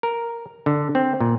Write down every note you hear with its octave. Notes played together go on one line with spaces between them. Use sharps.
A#4
D3
C4
A#2